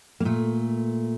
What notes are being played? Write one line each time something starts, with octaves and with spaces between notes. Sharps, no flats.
A#3
A#2 A3